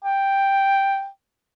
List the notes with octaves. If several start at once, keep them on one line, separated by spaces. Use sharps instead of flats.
G5